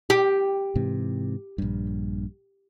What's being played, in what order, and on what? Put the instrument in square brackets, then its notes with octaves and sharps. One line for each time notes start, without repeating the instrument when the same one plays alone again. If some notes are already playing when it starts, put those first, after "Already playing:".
[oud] G4
[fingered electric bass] G#2 C3 E3
A#1 G2